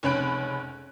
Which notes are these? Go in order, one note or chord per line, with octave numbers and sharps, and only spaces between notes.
F1 C#2 C#4 B5 F#6 D7